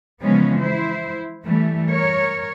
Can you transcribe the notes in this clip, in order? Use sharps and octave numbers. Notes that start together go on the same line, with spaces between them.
C#3 E3 F3 G#3 B3 C#4
E4 C5
E3 G3 A3
A#4 C#5